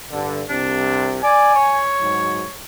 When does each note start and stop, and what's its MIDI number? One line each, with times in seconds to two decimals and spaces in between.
0.11 0.43 43
0.11 0.43 50
0.50 1.18 36
0.50 1.18 48
0.50 1.13 62
1.23 1.55 74
1.23 1.79 80
1.55 2.57 73
2.01 2.43 44
2.01 2.43 54